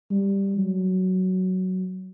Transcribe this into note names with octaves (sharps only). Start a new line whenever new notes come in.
G3
F#3